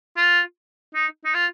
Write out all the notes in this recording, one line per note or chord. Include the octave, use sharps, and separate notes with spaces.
F4
D#4
D#4
F4